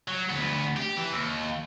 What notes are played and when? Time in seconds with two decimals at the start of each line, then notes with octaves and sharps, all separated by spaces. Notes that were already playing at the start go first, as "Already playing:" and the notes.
0.08 F#3
0.30 D2 B3
0.77 G4
0.97 E3
1.12 D#2